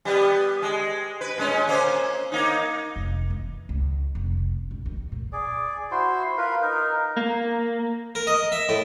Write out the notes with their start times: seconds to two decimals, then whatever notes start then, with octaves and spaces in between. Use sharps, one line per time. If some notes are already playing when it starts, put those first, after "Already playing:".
0.05 G3 B3
0.62 G#3
1.21 B4
1.38 A#2 G#3 C#4
1.67 A#3 C#4 C5
2.32 A#3 D#4
2.96 F1
3.30 E3
3.69 C#2
4.15 F1
4.71 A#1
4.86 D#2
5.12 A#2
5.33 G#4 D5
5.91 E4 F#4 C5 C6
6.37 F4 A#4 B4
6.62 D#4 A#4
7.16 A#3
8.15 A#4
8.27 D#5
8.52 E5
8.69 A2